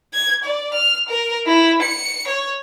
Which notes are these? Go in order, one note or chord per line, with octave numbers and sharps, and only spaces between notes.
G#6
D5
F6
A#4
E4
C#7
C#5